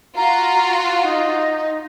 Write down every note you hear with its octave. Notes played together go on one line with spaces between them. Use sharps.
F4 F#4 A#5
D#4